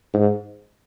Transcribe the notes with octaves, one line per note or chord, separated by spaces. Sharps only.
G#2